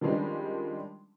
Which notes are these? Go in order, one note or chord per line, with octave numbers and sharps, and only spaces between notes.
D#3 F3 G3 G#3 C#4 D4